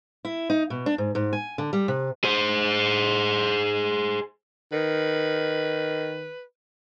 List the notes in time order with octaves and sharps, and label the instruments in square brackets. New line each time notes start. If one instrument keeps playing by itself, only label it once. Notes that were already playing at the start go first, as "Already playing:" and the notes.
[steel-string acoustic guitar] E4
D#4
B2
D4
G#2
G#2
G#5
D3
G3
C3
[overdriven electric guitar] G#4 C5
[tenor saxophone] D#3 [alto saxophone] B4